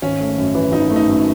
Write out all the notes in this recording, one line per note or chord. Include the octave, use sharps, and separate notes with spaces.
G#1 C#4
A3
F#2
E3
G#1 D#4
A3
D#4
F#2